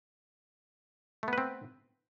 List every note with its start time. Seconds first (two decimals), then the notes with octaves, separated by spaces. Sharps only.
1.23 A3
1.28 B3
1.33 B4
1.38 C4